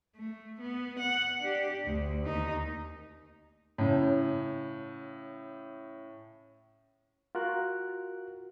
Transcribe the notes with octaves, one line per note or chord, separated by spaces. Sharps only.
A3
B3
F#5
D4 G4
D2
D#2 D#4
A2 C#3
F4 F#4 A#4 F#6